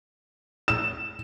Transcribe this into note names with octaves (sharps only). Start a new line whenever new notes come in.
E7